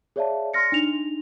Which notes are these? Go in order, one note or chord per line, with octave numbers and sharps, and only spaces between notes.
G#4 C#5 D5 E5 F5 A5
C6 F6 A#6 C#7
D4 D#4 F7